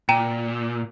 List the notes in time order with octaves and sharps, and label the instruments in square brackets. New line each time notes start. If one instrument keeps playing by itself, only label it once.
[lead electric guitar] A#2 [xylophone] G5 A#5 D#7